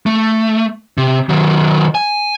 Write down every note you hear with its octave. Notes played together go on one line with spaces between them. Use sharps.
A3
C3
D#3 F#3
G#5